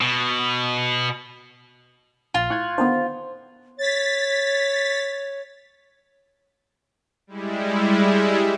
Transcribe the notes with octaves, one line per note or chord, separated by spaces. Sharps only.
B2
A#1 F4
A2 C#6 F#6 G#6
D3 D#3 B3 C5
C#5 A6 B6
G3 G#3 E4